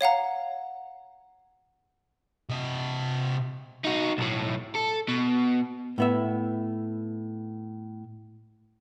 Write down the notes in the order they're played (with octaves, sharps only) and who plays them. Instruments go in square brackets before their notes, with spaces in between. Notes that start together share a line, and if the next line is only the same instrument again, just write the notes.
[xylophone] C#5 F5 F#5 A#5
[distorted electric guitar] C3 D#5
[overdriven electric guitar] D#4 F#4
B1 A2
A4
B2
[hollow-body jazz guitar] A2 B3 E5